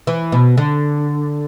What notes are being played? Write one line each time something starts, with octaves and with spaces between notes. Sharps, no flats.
E3
B2
D3